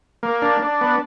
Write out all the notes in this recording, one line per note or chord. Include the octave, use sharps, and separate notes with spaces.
A#3
D4
D4
B3